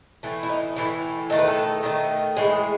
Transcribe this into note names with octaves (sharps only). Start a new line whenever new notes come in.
A2 E3 A3
E4
D#4
A2 E3 A3 E4
D#3 A3 D#4 A4
B4
A4
D#3 A3 D#4
A2 E3 G#3 G#4